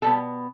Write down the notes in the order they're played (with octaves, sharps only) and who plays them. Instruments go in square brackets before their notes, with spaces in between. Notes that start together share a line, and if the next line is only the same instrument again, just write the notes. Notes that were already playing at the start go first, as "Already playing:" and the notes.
[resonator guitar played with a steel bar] B2 G3 B3 A4